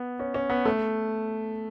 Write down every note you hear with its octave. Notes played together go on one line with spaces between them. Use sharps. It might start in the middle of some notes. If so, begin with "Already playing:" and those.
Already playing: B3
C#4
C#4
B3
A3